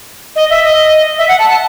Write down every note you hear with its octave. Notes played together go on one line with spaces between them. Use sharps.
D#5
E5
D#5
E5
F#5
A5
A5